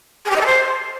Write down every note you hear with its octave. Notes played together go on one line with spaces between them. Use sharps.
G#4
G4
D#5
A4
C5